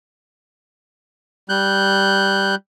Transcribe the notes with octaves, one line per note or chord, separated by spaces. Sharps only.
G3 F#6 G6